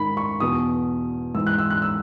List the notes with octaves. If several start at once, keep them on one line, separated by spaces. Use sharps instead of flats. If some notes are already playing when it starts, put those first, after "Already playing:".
Already playing: G#2 D#3 B5
C#6
E2 B2 D#6
G#2 E3 E6
F#6
E6
F#6
E6